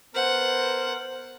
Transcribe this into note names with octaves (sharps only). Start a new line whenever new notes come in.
B3 A#4 C5 F#5